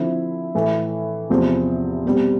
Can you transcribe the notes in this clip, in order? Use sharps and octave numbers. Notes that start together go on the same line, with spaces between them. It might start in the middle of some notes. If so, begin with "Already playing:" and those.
Already playing: D3 F3 C4 E4
A2 E3 A3
E2 C3 F3 C4
B2 G3 C4